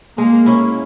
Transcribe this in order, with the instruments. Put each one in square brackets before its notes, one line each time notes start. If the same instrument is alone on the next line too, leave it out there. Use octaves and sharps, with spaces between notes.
[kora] G#3 [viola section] A#3
[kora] C#4 E4